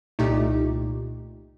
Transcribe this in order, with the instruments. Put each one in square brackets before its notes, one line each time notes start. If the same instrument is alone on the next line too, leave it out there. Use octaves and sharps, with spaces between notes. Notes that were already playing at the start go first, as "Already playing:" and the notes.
[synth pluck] C2 A#2 A3 D#4 G4